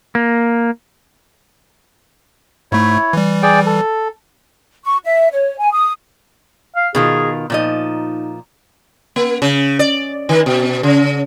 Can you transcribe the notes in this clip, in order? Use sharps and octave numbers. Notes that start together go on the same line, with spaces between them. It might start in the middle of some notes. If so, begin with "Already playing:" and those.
A#3
G#2 A3 E4 C#5
E3 G3
G#4 D5 G5
A4
C#6
E5
C#5
G#5
D#6
F5
B2 D#3 F4 G#4
A#2 F3 D#4 D#5
A#3
C#3
D5
D#3
B2
C#3